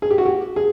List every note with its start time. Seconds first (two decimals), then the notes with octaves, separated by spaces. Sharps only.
0.02 G#4
0.11 G4
0.18 F#4
0.25 G4
0.56 G#4